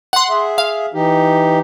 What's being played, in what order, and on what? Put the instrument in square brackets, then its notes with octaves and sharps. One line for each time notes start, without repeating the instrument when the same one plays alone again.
[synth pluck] F#5 C6
[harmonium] G#4 E5
[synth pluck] F5
[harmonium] E3 D#4 G4